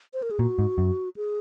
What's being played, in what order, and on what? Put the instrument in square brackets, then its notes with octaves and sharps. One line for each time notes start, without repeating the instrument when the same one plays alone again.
[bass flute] C5
A#4
G#4
[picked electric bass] A#2 [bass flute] F#4
[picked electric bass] G#2
F#2
[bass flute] G#4